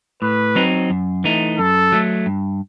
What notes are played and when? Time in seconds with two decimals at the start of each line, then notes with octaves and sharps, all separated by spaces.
0.22 A2 B4
0.55 F#3 C4 D#4
0.90 F#2
1.24 E3 A3 D#4
1.58 F#2 A4
1.92 F#3 A3
2.26 G2